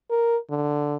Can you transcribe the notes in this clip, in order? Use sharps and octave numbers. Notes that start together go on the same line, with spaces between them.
A#4
D3